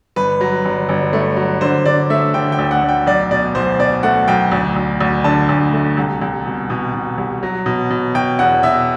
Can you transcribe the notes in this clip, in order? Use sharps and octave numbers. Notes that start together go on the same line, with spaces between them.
G1 B4
F#3
G1
G1
A3
F#3
D3 C5
D3 D5
A3 E5
D3 G5
G5
D2
F#5
D2
G5
B1 D5
B2 D5
B1 C5
B2 D5
A3 F#5
B1 G5
D2
D2
D2
D3 A5
D2
A3
C2
C2
B2
B2
B2
C2
F#3
B2
B2
B2 G5
E2 F#5
B2 E5